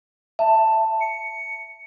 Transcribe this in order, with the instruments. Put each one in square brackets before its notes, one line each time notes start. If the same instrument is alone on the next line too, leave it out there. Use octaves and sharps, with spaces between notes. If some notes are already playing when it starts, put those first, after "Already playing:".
[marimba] E5 [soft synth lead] A5
[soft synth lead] C#7